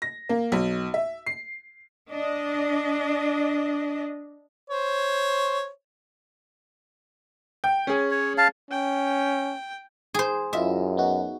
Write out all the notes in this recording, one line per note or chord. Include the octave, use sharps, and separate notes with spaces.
A#6
A#3
B1
E5
C7
D4 D#5
C5 C#5
G5
C#4 G#4
C#5
F5 A5
C#4 G5
G#4 C5
F#2 E4 F4 D#5 E5
B3 D#4 F#4